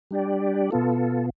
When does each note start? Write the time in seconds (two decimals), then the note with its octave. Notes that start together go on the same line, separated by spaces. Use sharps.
0.11 G3 D4 G4 D5
0.71 B2 B3 F4 A4